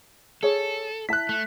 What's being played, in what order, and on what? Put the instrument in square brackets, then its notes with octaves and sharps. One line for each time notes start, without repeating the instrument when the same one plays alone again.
[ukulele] G#4 C#5 [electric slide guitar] A4
[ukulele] E4 A5 [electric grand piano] F#6 B6
[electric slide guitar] A3